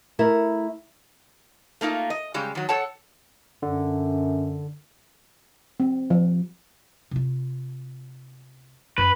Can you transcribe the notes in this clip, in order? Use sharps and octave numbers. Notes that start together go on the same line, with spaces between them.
A3 E4 A#4
A3 A#3 D#4 F4
D#5
C#3 G3 G#3
D#3 F#3
A4 C#5 F#5 A5
F#2 D3
C4
F3
C3 F4
F#2 B4